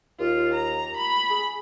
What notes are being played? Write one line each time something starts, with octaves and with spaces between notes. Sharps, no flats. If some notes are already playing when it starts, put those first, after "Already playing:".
D#2 F4
A#5
B5
G#4